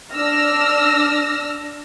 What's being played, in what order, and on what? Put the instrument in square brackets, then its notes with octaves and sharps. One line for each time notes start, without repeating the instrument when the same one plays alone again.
[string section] D4 E6 F6 A#6